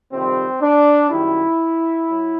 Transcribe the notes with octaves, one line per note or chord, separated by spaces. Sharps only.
F2 C3 D#3 G3 C4
D4
F#2 D#3 G3 E4
F#3